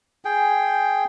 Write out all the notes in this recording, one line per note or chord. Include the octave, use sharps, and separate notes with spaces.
G#4 G5